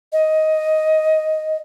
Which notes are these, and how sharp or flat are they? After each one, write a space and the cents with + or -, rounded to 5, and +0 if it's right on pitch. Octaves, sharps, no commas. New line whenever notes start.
D#5 +10